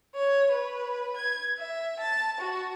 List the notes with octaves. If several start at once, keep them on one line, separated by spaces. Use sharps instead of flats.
C#5
B4
G#6
E5
A5
F#4